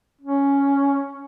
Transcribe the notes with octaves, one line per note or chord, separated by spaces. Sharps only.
C#4